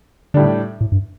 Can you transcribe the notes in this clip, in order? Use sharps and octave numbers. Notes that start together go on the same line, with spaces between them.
A2 D3 G3 D4
A2
G2